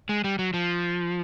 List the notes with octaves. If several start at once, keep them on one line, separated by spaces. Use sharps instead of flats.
G#3
G3
F#3
F3